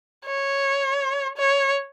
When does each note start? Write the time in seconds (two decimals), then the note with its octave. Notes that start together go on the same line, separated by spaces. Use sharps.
0.26 C#5
1.37 C#5